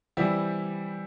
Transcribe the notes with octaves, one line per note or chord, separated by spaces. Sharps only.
E3 G3 C4 E4 G4